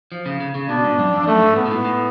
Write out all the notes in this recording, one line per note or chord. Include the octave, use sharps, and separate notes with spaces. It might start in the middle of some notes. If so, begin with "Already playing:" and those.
F3
C#3
C#3
C#3
B2 D4
G#2
F#2
F2
F2
F#2 A3
G#2
G#2 B3
B2
A2
A2